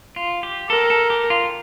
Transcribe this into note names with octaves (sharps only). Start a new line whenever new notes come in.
F4
G4
A4 A#4
A4
G4
F4